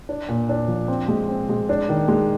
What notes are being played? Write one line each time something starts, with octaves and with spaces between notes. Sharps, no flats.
D4
A#2
D4
F3
C4
G#3
C4
G#3
D4
D#3
G#3